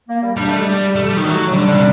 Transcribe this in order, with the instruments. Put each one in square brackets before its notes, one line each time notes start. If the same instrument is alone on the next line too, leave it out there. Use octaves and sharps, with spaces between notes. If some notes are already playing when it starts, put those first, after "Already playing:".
[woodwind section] A#3
G3
[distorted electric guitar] G3 [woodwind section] D4
[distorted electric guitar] A3
G3
A3
G3
D#3
[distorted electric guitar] F#3 [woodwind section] A3
[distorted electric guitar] D3 [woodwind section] G3
[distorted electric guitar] D3
C3